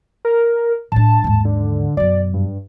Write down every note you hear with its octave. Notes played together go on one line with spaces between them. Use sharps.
A#4
A2 D4 A5
D#2 G#2
D3
F#2 B2 D5
G2